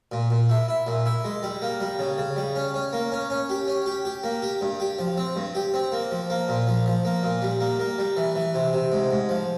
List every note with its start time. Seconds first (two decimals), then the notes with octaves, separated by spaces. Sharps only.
0.12 A#2
0.30 A#2
0.49 E4
0.68 E4
0.87 A#2
1.06 E4
1.24 G#3
1.43 G3
1.62 A#3
1.80 G3
1.99 C#3
2.18 C#3
2.36 G3
2.56 C#4
2.74 C#4
2.93 A#3
3.12 C#4
3.30 C#4
3.49 G4
3.67 C#4
3.86 G4
4.05 G4
4.23 A#3
4.42 G4
4.61 G2
4.80 G4
4.99 F3
5.17 C4
5.36 G2
5.55 G4
5.74 C4
5.92 A#3
6.11 F3
6.30 A#3
6.48 A#2
6.67 F3
6.86 F3
7.05 A#3
7.23 A#2
7.42 G3
7.60 A#3
7.80 A#3
7.98 G3
8.17 E3
8.35 E3
8.54 C3
8.73 C3
8.92 G#2
9.11 G#2
9.29 F3